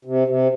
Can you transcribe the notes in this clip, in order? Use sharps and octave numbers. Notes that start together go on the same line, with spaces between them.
C3
C3